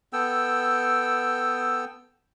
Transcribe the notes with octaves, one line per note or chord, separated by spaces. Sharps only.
B3 A4 G5 E6